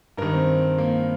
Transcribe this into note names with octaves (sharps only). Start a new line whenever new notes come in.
G2 D#3 A#4
C4
A#3